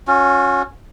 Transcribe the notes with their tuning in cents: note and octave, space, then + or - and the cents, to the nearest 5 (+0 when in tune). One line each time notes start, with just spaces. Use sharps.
C#4 +0 F#4 -40